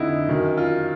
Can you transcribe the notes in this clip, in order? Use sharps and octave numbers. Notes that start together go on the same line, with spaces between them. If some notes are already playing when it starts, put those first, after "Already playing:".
Already playing: F2 D3 D#4 E4
F#2 D#3
F4